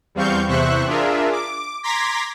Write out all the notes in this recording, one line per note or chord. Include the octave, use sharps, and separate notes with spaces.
E2 G3 C4 F5 C#6 G6
E2 C3 C5 E5 C#6 F#6
D4 F4 G#4 A#4 E5
D6
A#5 C6 D6 G#6 A#6 B6